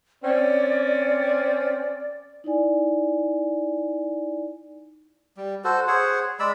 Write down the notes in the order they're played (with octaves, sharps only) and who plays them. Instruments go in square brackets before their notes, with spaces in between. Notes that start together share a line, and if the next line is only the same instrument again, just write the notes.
[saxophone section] C4 C#4 [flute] D5
[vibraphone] D#4 E4 D5 G#5
[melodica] G3
F#4 A4 C5
G#4 C5 C#5 F#5
G#3 D5 B5 E6